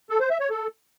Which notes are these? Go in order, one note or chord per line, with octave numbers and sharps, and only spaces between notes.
A4
C5
E5
C#5
A4